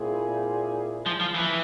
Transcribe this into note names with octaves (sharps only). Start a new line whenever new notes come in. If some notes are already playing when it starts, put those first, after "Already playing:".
Already playing: A#2 G3 C4 E4 G#4
F3
F3
E3